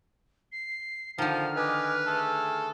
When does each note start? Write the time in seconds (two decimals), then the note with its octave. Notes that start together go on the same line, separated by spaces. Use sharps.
0.52 C7
1.18 D3 D#3 F3 F6
1.57 B4 D#5 G#5 D6
2.08 A3 G#4 A4